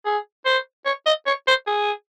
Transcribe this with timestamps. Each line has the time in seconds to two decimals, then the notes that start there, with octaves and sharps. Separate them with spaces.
0.06 G#4
0.45 C5
0.86 C#5
1.06 D#5
1.27 C#5
1.47 C5
1.67 G#4